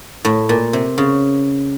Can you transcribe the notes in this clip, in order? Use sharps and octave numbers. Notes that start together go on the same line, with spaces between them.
A2
A#2
C3
C#3